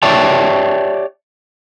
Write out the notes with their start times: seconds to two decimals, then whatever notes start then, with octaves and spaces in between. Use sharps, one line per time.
0.03 G4 C#5 D5 E5 G5 A5